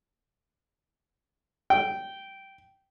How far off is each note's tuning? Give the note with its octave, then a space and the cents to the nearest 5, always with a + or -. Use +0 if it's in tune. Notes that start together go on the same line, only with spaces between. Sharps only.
G5 -10